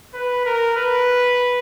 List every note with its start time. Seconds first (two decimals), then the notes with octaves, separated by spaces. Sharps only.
0.14 B4
0.45 A#4
0.77 B4